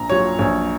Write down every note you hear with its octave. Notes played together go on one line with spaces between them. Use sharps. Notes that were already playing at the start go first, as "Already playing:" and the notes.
Already playing: A#1 A#5
A#2 F#3 C#5
A#1 C#5